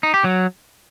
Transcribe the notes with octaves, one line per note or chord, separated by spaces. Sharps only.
D#4
G4
F#3